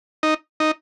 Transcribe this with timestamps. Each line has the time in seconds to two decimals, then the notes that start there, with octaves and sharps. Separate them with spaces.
0.23 D#4
0.60 D#4